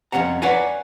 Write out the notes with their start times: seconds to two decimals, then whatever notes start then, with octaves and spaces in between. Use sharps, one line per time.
0.12 F2 G#2 C#4 F#5 A#5
0.42 B4 C#5 D5 F#5 G#5 A#5